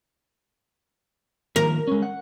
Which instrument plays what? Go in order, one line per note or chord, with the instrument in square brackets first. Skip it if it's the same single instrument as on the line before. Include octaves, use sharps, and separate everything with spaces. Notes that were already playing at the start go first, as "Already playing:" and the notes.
[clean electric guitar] D#3 F3 A#3 [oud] A#4
[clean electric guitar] G#3 C#4
F#5